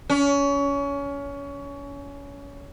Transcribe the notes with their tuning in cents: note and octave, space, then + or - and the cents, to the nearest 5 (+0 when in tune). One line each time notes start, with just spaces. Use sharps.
C#4 +25